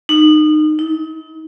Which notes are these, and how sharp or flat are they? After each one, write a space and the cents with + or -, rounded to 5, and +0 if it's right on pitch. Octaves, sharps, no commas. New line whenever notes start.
D#4 -25
D#4 +40